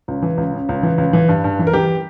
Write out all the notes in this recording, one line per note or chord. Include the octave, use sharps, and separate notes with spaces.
C#2
E3
C#2
C#3
C#2
E3
C#2
E3
G2
G2
E3
A#4
E3 G4